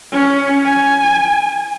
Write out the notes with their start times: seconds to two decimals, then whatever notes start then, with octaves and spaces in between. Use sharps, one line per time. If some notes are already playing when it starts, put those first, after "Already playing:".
0.12 C#4
0.65 G#5